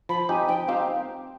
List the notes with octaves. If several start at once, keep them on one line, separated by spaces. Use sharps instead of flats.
F3 B5
C4 D#4 G4 G#5
F3 G5
C4 D#4 G4 F5